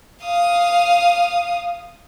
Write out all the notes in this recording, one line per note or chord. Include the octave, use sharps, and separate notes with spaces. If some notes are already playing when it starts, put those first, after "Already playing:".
F5 D#6